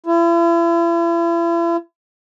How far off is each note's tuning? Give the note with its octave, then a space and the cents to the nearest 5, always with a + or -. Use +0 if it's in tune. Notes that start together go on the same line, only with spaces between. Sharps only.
E4 +40